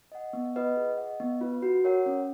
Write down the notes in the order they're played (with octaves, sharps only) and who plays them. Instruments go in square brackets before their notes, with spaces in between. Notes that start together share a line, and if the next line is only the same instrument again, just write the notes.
[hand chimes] D#5 F#5
B3
F4 B4 D#5 F#5
G#4
D#5 F#5
B3
F4 B4
F#4
A#4 C#5 F#5
C#4